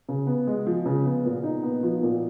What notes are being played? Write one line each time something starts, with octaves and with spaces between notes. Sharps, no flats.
C#3
B3
G#3
F3
C#3
B3
A#2
D#4
B3
F3
A#2